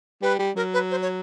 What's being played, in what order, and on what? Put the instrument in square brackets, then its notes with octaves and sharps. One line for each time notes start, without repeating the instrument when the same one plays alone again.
[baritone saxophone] G3 [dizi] B4
[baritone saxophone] G3
[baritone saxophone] F#3 [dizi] A#4
[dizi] B4
C5
C#5